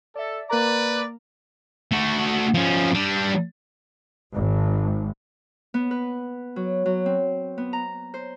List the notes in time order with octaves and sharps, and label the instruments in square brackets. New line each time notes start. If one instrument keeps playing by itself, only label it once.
[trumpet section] A4 [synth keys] D5 E5
[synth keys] A#3 A#4 A#5 [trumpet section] B4 D5
[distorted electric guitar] A3 F#4
F3 C#4
G3 D4
[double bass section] G#1
[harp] B3
B4
F#3
F#3
C4
B3
A#5
C5